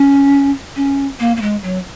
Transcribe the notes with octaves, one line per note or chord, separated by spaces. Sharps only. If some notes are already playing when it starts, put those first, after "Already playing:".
Already playing: C#4
C#4
A#3
A#3
G#3
F#3